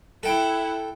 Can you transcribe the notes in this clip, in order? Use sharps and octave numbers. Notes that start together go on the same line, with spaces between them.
E4 A4 F#5 G5